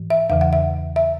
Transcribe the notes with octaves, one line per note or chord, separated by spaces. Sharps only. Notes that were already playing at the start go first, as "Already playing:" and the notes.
Already playing: G#2 E3
E5
E2 C#3 E3 E5
F#5
E5
E5